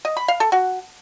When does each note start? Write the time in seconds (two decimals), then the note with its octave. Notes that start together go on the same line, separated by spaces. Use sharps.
0.05 D#5
0.17 B5
0.28 F5
0.40 A4
0.52 F#4